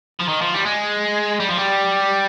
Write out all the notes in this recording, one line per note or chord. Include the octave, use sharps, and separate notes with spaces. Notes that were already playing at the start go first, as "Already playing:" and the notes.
F3
D#3
F3
G3
G#3
G3
F3
G3